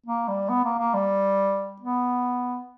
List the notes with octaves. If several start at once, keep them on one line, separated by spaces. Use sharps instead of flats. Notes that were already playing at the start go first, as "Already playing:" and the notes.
A#3
G3
B3
A#3
A#3
G3
B3